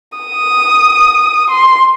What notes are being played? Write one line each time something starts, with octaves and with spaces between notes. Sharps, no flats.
D#6
C6